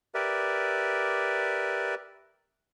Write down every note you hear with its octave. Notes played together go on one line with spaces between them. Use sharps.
G4 A#4 B4 D5 E5